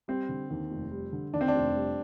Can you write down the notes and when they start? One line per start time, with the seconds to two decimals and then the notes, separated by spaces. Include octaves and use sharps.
0.08 G3 C4
0.29 D3
0.51 D#2
0.71 F1
0.91 G3
1.13 D3
1.33 D#2 D4
1.41 C4
1.48 D4
1.55 F1
1.76 G3